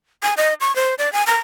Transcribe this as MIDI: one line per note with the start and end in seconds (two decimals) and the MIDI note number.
0.23 0.34 80
0.37 0.54 75
0.61 0.75 85
0.76 0.95 72
0.98 1.11 74
1.13 1.24 80
1.27 1.38 82